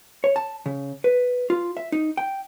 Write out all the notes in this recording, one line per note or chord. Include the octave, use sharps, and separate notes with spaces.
C#5
A5
C#3
B4
F4
E5
D#4
G5